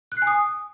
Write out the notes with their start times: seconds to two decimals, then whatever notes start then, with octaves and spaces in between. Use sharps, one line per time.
0.12 F#6
0.17 C7
0.22 G#5
0.27 D#6